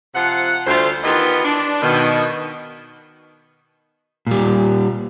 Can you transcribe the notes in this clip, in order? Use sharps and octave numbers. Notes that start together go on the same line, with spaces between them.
C3 F3 F4 F#5
D2 G3 A3 F4 C5
D#3 E3 B3 F4 G4 D#5
D4
B2 D#3
A#2 G3